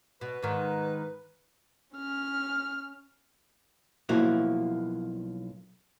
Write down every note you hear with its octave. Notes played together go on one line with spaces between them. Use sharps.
B2 B4
G#2 D#3
C#4 F6
B1 F3 A#3 E4 F#4